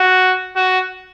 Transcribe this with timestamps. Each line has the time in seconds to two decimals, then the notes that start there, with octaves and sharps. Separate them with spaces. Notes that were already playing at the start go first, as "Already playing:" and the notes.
Already playing: F#4
0.56 F#4